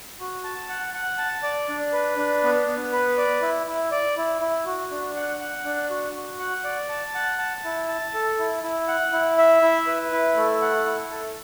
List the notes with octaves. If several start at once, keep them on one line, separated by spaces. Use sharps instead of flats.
F#4
A5
F#5
F#5
A5
D5
D4
B4
D4
B3
B3
B4
D5
E4
E4
D5
E4
E4
F#4
D4
F#5
F#5
D4
F#4
F#4
F#5
D5
A5
F#5
A5
E4
A5
A4
E4
E4
F#5
E4
E5
E4
B4
E4
A3
F#5
E4
A4